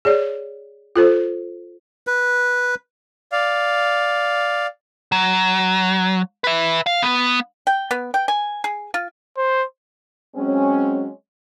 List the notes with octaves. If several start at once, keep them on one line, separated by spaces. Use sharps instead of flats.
G#4 C#5 D5
F4 A4 C5
B4
D5 F5
F#3
B4 E5
F5
B3
G5
B3
G5
G#5
G#4
F4
C5
F#3 G#3 C4 C#4